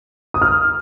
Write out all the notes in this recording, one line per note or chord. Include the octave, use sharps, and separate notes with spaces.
D#6
F6